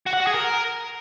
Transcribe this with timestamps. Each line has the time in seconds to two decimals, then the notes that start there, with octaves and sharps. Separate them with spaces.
0.07 F#4
0.13 F#5
0.20 F#4
0.27 G#4
0.34 A#4